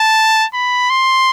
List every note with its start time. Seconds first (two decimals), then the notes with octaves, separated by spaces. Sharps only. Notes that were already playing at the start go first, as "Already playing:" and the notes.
Already playing: A5
0.54 B5
0.90 C6